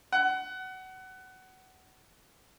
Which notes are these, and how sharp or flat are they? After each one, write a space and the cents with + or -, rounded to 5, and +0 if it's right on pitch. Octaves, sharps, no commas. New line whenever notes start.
F#5 +20